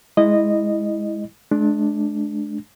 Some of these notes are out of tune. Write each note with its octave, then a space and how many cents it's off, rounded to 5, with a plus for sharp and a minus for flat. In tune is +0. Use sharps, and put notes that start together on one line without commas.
G#3 +0 E4 -15 D#5 -15
G#3 +45 D4 +5